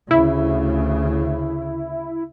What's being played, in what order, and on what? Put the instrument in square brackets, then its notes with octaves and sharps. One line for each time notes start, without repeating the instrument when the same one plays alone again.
[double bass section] D2 C#3 [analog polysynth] E4